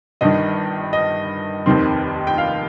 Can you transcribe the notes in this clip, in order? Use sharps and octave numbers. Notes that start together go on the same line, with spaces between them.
G1 G2 D#3 D#5
D#5
F1 D#2 D#3 C4
G5
F5